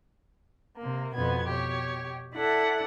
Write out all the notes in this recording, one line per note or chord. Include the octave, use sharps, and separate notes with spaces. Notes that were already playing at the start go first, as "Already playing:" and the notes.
C3 A#3
F2 B2 B3 G#6
B2 G4 C#5
E4 A4 D5 F#5